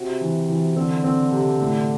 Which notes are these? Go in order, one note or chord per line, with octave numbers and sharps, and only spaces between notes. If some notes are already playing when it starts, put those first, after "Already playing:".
Already playing: C3 F#4
E3
E3
D3 C4
C4
C3
A2